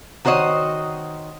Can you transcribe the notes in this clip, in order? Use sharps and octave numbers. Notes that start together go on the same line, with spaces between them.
D#3 F#4 C5 C#5 D#5